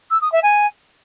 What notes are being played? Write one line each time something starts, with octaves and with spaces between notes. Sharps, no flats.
E6
D#6
E5
G#5